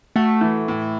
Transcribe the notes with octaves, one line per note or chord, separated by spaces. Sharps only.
A3 F#4
E3
A2